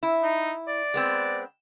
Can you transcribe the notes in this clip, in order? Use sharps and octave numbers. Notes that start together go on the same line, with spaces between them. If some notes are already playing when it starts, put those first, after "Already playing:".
E4
D#4
D5
G#3 B3 C4